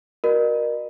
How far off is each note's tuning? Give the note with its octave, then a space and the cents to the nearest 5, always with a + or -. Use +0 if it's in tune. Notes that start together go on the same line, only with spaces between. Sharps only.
F#4 +0 A#4 +25 D#5 -40